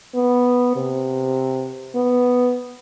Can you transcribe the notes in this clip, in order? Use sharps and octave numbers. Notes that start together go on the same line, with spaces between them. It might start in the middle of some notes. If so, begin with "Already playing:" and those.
B3
C3
B3